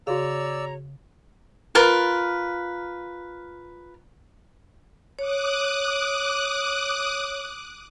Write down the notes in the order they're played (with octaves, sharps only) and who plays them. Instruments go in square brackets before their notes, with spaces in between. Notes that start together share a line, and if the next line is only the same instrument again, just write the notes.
[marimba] C#3 F5 [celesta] F#4 G#4 [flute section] C#5 A#5 [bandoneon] D5 E6
[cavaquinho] F4 A#4 B4
[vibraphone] C#5 [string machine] D6 D#6 F#6